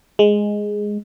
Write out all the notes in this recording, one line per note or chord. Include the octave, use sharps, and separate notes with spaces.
G#3